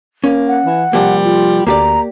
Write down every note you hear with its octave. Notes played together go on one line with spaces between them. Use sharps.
A#3 C#4
F#5
E3
C3 F3 G3 A#3
F4
D2 A#3 G4 D5 A#5